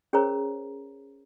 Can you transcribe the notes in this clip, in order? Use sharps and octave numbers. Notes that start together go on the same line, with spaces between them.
C#4 G#4 A#4 C5 C#5 A#5